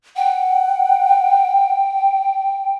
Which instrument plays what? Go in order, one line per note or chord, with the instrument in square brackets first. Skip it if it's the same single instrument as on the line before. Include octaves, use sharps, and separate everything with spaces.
[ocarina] F#5 [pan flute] G5